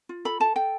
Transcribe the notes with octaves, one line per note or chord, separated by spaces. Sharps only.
F4
A4 B5
A4 A5
A4 G5